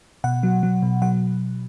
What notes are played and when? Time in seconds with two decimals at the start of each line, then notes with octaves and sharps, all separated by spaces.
0.24 B2 F#5
0.43 F#3
0.63 F#3
0.82 B2
1.02 F#3 F#5